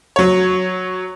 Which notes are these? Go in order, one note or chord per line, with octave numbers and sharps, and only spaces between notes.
F#3 C#5